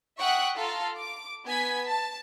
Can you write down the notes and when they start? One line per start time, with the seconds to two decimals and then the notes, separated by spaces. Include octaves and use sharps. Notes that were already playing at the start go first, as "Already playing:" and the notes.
0.19 E5 F#5 G5 C#6 D#6 F#6
0.56 F4 A4 F5 A#5
0.97 D6
1.45 B3 G#5 G#6 B6
1.87 A5